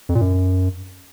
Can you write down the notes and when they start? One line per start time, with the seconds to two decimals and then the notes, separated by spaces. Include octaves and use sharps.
0.09 F2
0.15 A#2
0.21 F#2